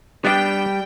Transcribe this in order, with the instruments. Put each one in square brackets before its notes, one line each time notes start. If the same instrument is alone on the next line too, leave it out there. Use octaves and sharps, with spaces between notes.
[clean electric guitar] G3 [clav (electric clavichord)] B3 D4 [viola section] G5